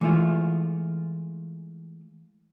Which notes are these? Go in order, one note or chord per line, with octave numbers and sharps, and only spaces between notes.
E3 G#3 A3 E4 F4